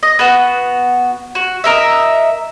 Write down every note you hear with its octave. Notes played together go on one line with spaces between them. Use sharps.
D#5
B3 F#4
F#4
A#4 D#5 E5